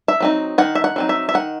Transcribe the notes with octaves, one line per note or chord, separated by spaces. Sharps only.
E5
F#3 C4 D#4
D#3 F#5
E5
F#5
F#3 C4 D#4
E5
E5
D#3 F#5